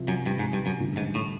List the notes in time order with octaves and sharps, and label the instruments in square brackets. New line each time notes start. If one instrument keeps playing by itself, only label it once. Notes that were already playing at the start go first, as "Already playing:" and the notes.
Already playing: [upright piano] C2 C3 F3
[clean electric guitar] F#2
G2
G#2
G2
F#2
[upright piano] A1 G2 D3
[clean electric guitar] G#2
A2